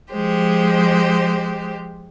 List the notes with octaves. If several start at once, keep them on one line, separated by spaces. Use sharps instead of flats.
F3 G#3 G4 C5